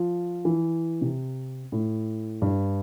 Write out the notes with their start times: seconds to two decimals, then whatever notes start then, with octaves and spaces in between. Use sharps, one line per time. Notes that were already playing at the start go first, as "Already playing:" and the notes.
Already playing: F3
0.45 E3
1.02 C3
1.72 A2
2.42 G2